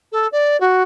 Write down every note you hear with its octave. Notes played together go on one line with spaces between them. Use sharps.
A4
D5
F#4